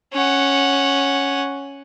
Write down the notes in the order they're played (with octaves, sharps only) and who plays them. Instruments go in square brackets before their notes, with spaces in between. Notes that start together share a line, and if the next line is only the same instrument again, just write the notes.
[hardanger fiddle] C#4 F#5